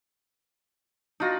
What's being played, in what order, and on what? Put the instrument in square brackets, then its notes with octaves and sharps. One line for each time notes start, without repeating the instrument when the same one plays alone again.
[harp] D4 F#4 A#6 [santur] D#4 F4